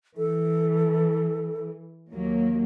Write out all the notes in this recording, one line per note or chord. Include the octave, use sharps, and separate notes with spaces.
E3 A4
D#2 F#3 A#3